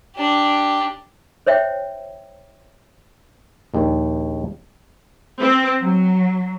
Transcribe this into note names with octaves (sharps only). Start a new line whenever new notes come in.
D4 G4
C5 C#5 E5 G5
A#1 D#2
C4
F#3